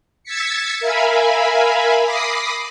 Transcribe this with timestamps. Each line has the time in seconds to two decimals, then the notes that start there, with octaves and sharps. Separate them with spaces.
0.24 E6 G#6 A6 B6 C#7
0.80 A#4 E5 F5 G#5 B5
2.04 B5 D6 D#6 A#6 C7